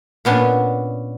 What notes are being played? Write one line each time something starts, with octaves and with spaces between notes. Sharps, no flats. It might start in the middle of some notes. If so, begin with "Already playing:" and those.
A#2 B3 C#4 D4